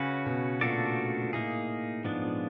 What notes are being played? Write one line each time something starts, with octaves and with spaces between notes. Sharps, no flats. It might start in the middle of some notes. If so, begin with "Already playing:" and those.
Already playing: C#3 C#4 F#4 B4
B2
A#2 A3 D4 F#4 A4 D5
A#2
A2 A#3 D#4 G#4
G#2 F3 G#3 B3 D4
A#2